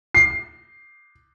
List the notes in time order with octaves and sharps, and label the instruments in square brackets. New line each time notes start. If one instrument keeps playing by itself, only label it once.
[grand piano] C7